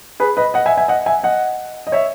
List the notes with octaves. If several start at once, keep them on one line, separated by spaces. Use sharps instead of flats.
G#4 B4
B4 D#5
D#5 F#5
E5 G#5
E5 G#5
D#5 F#5
E5 G#5
D#5 F#5
D#5
C#5 E5